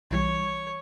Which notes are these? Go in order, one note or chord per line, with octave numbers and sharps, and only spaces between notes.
B1 E3 G3 C#5